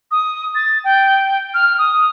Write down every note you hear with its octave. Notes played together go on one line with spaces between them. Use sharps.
D#6
A6
G5
F6
D#6